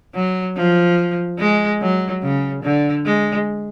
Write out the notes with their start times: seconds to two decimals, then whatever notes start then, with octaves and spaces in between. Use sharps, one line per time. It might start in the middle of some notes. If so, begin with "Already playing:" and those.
0.15 F#3
0.56 F3
1.39 G#3
1.82 F#3
2.23 C#3
2.63 D3
3.05 G#3